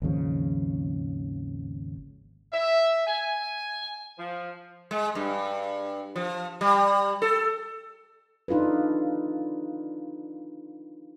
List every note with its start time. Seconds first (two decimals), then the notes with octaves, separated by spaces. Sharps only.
0.02 G#1 D#2 C#3 F3
2.53 E5
3.06 G#5
4.18 F3
4.91 G#3
5.15 G2
6.16 F3
6.61 G3
7.22 A4
8.48 D4 D#4 F4 A4 B4